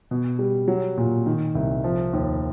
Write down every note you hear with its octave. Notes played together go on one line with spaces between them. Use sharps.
B2
G3
F#3
A#2
D#3
C2
F3
D#2